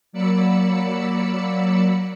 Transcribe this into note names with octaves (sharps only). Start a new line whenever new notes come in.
F#3 A#3 D5 B5 E6 C#7